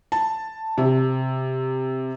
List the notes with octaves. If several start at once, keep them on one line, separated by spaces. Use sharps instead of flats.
A5
C3